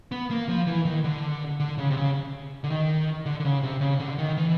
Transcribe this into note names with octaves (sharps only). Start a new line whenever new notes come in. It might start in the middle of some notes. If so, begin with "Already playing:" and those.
B3
A#3
F3
E3
D#3
D3
D3
C#3
C3
C#3
D3
D#3
D3
D3
C#3
C3
C#3
D3
D#3
E3